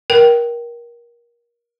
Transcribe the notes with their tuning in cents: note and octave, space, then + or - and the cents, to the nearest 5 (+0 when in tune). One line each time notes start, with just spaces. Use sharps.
A#4 +25 G5 -15